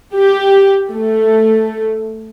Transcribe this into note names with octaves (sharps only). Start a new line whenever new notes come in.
G4
A3